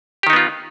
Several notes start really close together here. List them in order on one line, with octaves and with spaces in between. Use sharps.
G4 D#3 D#4 B3 F4